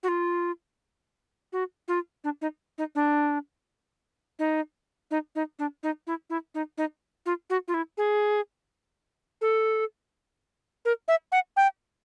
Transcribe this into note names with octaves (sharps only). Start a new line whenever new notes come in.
F#4
F4
F#4
F4
D4
D#4
D#4
D4
D#4
D#4
D#4
D4
D#4
E4
E4
D#4
D#4
F4
F#4
F4
E4
G#4
A4
A#4
E5
F#5
G5